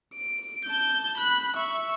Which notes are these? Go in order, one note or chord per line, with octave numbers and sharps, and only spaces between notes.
D7
A5 G6
B5 F#6
E5 C#6